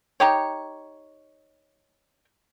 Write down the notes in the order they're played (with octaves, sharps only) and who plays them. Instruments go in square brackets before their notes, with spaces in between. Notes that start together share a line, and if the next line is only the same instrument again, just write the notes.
[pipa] D#4 G4 C#5